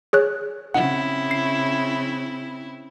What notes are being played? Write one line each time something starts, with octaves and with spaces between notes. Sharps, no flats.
G#4 C#5 F#6
C#3 C4 E4 F#5
C7